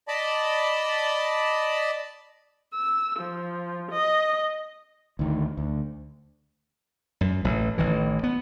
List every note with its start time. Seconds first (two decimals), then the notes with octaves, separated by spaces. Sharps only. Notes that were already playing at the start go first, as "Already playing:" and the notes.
0.08 D5 D#5 A5 B5
2.74 E6
3.18 F3
3.91 D#5
5.19 D2 D#3
5.57 D2
7.21 F#2
7.44 A1
7.78 A1 D#3 E3
8.24 B3